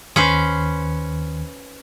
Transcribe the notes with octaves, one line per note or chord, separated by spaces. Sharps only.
D#2 D#3 C#4 B4 C5